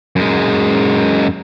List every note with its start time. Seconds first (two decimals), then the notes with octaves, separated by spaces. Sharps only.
0.16 F#2 G#3